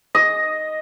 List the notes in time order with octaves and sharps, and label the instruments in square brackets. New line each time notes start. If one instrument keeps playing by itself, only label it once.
[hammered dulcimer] D#5